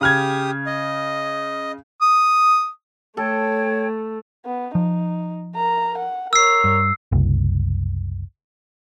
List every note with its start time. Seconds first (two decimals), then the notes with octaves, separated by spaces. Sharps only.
0.01 C#3 G4 D#6 F6 G#6
0.66 D#5
2.02 D#6
3.17 A3 A4 C#5 G5 G#6
4.45 B3
4.75 F3 D#4
5.56 A#4 A#5
5.98 F#5
6.33 A#4 C#5 E6 C7
6.64 G2
7.12 F#1 C2